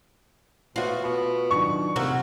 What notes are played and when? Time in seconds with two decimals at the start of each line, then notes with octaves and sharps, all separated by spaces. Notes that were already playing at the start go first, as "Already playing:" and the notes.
0.76 B2 F4 F#4 C5 C#5 E5
1.04 B2 C#6
1.51 D#3 F#3 D4 C#6
1.96 E2 C3 F#3 A#3 F#4 C5 E6